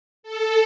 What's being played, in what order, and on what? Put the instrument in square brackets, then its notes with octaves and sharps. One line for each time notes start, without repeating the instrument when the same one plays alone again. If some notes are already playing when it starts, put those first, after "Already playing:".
[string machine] A4